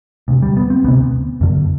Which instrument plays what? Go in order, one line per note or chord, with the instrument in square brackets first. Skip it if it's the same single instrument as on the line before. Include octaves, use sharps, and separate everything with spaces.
[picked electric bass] D2 C3
G3
B3
C4
D2 C3 B3
F#2 D3